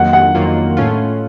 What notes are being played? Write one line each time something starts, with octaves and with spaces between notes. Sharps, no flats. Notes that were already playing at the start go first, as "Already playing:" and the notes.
Already playing: F2 D#3 F#3 A#3 F4 F#5
F#5
F2 D#3 F#3 A#3 F4
A2 A3 C#4 F4